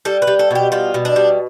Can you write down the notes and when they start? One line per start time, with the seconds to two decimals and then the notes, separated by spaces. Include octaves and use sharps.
0.05 G3 A4
0.22 B4
0.27 G3
0.39 A4
0.51 B2 G4
0.72 G3 F4
0.94 B2
1.05 D4
1.16 G3